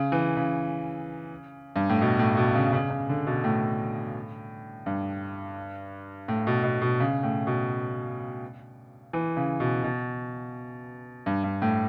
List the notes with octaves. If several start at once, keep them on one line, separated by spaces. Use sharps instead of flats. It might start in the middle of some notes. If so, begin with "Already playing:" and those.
Already playing: C#3
E3
C#3
G2
A2
B2
A2
B2
C#3
C#3
C#3
D3
B2
A2
G2
A2
B2
B2
B2
C#3
A2
B2
E3
C#3
B2
B2
G2
G2
A2